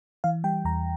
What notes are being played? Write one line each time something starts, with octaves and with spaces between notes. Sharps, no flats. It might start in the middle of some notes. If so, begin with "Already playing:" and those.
E3 F5
G3 G5
E2 A#5